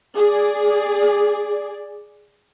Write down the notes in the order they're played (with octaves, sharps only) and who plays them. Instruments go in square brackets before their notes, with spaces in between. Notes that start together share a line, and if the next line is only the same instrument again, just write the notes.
[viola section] G#4 D5